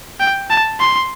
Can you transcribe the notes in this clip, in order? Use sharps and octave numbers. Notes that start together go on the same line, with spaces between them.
G5
A5
C6